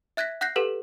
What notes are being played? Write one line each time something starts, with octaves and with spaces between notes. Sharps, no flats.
E5 F#6 G#6 A#6 B6
F#5 F#6 G6 A#6 C7
G4 A4 B4 F#5